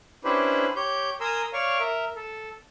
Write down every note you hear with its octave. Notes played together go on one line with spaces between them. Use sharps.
C#4 D4 E4 G4 B4 C5
G4 C#5 G6
A#4 G#5 A#5 C6 D#6 E6
C#5 D5 F5 C#6
A#4 E5
A4